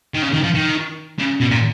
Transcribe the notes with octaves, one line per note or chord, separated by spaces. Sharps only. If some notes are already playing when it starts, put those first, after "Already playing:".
D#3
C#3
D#3
F3
D#3
C#3
B2
A#2